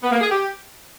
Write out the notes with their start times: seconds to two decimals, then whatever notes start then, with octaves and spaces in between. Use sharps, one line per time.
0.03 B3
0.12 A#3
0.21 G#4
0.31 G4